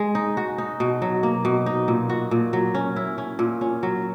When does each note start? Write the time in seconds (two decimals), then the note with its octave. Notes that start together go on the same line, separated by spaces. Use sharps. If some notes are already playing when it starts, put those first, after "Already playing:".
Already playing: G#3
0.15 D#4
0.37 F#4
0.58 D#4
0.80 B2
1.02 F#3
1.23 A#3
1.45 B2
1.66 D#4
1.88 A#2
2.09 F#4
2.31 A#2
2.53 F#3
2.74 C#4
2.96 E4
3.18 C#4
3.39 A#2
3.61 C#4
3.83 F#3